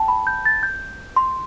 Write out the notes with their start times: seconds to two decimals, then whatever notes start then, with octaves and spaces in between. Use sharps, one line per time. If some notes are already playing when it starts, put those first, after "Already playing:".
Already playing: G5 A5
0.08 B5
0.27 G6
0.45 A6
0.63 G6
1.16 C6